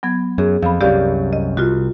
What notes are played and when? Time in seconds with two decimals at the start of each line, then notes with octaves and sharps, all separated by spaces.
0.03 F#3 B3 G#6
0.38 F#2 G#4
0.63 F2 F5 B5
0.81 C2 F#2 G4 D5 F5
1.33 D#5
1.57 C2 F4 F#4